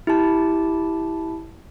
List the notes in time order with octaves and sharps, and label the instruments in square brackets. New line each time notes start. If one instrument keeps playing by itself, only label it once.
[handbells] E4 G4 A5